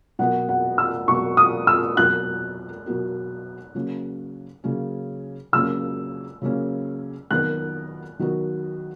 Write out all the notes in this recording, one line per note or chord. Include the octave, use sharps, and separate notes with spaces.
B2 F#3 B3 F#4 A#4 F#5
F#5
E6
B2 F#3 B3 F#4 A#4 C#6
D#6
E6
B2 F#3 B3 F#4 A#4 F#6
B2 F#3 B3 F#4 A#4
C#3 F#3 A#3 C#4
C#3 F#3 A#3 C#4
C#3 F#3 A#3 C#4 E6
C#3 F#3 A#3 C#4
D#3 F#3 B3 F#4 A#4 F#6
D#3 F#3 B3 F#4 A#4